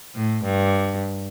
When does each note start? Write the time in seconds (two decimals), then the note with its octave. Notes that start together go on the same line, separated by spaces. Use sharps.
0.15 A2
0.44 G2